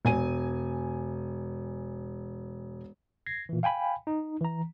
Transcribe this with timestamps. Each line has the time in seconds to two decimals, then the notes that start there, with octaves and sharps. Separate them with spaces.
0.05 E1 G#5 D#7
3.26 G#6 A#6 C7
3.49 A#2 E3
3.63 F5 G5 G#5 B5
4.07 D#4
4.41 E3 A#5